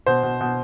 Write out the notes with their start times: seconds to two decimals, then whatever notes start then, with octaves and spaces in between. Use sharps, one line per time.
0.06 B2 C5
0.23 B2
0.41 B2